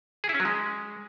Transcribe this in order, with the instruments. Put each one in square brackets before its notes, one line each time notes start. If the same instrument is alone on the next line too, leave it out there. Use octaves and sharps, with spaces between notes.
[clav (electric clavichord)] G#4
E4
C#4
F#3
G#3